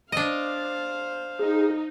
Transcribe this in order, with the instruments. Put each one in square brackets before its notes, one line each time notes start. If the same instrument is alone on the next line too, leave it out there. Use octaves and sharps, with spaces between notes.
[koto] D4 D#5 [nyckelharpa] C5 F5
[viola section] D#4 [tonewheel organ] G#4